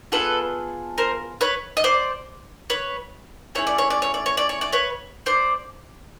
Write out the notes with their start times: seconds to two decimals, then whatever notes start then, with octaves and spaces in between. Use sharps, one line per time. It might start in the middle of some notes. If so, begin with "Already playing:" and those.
0.12 B3 D4 F4 G#4 A4 B4
0.98 A#4 C5
1.41 B4 C#5
1.77 D#5
1.84 C5 D5
2.70 B4 C#5
3.55 A3 C#4 E4 G#4 C#5
3.67 D5
3.78 C#5
3.90 D5
4.02 C#5
4.14 D5
4.26 C#5
4.37 D5
4.49 C#5
4.61 D5
4.72 B4 C#5
5.26 C5 D5